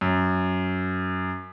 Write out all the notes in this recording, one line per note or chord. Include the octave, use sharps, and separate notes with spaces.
F#2